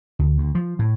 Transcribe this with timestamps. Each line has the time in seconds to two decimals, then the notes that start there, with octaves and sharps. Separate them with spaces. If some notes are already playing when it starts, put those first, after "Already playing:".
0.19 D2
0.38 D2
0.55 F3
0.79 A2